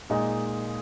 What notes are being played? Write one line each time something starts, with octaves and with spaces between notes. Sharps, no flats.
A#2 G#3 D#4